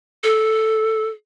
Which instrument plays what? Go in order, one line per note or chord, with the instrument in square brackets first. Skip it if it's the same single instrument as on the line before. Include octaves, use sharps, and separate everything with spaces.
[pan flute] A4